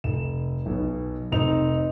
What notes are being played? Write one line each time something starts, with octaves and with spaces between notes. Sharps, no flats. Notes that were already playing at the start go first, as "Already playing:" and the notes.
F1 E7
B1 B2
F1 C4 D#4 F7